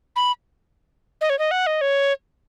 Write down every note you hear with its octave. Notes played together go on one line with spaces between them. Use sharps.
B5
D#5
C#5
D#5
F#5
D#5
C#5